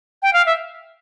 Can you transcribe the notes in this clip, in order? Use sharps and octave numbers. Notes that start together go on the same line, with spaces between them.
G5
F5
E5